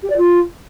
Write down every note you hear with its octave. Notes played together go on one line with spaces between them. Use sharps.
G4
D5
F4